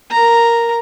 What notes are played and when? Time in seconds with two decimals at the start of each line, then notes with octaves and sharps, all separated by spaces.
0.11 A#4 A#5